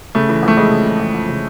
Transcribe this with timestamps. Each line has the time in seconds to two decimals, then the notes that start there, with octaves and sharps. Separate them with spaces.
0.15 C#3 A3
0.29 E3
0.42 F2
0.48 A3
0.57 F2 G#3
0.71 C#3
0.85 E3
0.99 F2
1.14 F2
1.29 C#3